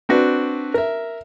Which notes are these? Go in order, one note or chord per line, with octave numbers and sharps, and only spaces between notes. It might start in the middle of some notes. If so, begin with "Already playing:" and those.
C4 D4 F#4 B4
A#4 E5